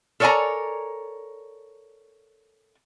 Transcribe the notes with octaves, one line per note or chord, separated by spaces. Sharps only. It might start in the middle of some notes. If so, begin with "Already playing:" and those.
A4 A#4 C#5 D5 G#5 A#5